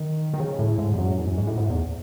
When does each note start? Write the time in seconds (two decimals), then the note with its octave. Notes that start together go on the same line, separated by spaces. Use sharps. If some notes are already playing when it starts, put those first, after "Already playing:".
Already playing: D#3
0.34 D#3
0.40 C#3
0.59 A2
0.78 G#2
0.94 E2
0.98 F#2
1.18 E2
1.27 F#2
1.37 G#2
1.47 A2
1.57 G#2
1.70 E2